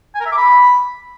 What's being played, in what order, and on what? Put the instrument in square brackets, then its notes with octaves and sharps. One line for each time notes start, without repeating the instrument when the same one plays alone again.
[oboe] G#5
A#4
E5
D6
B5